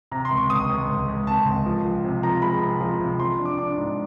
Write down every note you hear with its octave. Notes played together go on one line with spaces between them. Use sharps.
C3 A#5
C6
C#2
C#6
C#2 D#6
C#2
C#2
C#2
C3 A5
C#2
F3
F3
C3
F3 A#5
G#3 B5
C3
F3
C3
F3 C6
D4
D6
D4 D6
G#2